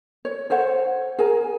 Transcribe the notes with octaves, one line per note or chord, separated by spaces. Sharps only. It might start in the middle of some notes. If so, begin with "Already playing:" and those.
C#5
A4 C5 C#5 F#5
G#4 A#4 G#5